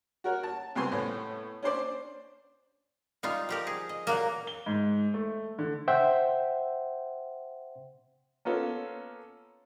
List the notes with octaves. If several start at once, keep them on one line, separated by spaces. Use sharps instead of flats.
F#4 A#4 C#5
A5
C2 B3 C4 G#5 C6
A2 B3 C#4
C#4 D4 C5 D5
G3 D#4 F4 F5
F3 G4 A#4
G#4
D#5
A#2 F#3 A#3 A#4
G7
G#2
A3
D3
C5 E5 F#5 G5 C6
A#3 B3 C#4 F4 A4